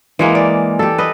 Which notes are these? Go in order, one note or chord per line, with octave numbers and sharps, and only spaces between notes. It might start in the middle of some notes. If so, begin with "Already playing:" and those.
E3 G#3 A#3
D5
G4 A4
B4 D#5